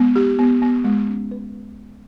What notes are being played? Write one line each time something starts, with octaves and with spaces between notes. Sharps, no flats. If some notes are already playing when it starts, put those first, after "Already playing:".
Already playing: G#3 B3
G4
B3
B3
G#3
C#4
B4